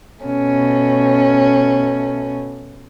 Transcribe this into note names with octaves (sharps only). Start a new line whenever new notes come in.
B2 A3 C#4